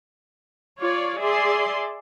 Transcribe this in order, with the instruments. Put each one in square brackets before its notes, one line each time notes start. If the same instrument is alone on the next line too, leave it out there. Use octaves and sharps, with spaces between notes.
[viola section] F4 C#5 D5
G#4 D5 E5 C6